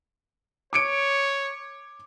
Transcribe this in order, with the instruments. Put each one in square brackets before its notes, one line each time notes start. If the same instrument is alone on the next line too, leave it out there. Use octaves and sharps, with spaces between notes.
[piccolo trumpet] C#5 [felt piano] D6 C#7 D7